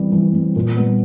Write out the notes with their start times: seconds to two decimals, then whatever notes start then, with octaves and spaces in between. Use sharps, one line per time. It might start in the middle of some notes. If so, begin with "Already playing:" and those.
Already playing: E3 G3 C4
0.12 E3
0.33 G3 C4
0.56 A#2
0.76 G3 B3